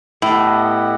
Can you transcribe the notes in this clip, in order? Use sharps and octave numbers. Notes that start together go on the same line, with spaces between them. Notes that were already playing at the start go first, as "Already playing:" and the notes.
A2 B3 E4 G4 D#5 F#5